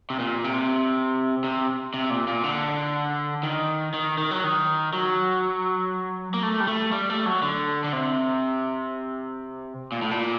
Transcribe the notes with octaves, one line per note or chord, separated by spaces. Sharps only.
C3
A#2
C3
C3
C3
A#2
A#2
D3
D#3
D#3
D#3
F#3
D#3
F#3
A#3
A3
G3
A3
G3
A3
F#3
D3
D3
C3
A#2
A2
A#2